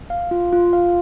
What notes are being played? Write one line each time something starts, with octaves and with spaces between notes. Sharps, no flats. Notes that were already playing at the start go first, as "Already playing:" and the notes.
F5
F4
F4
F5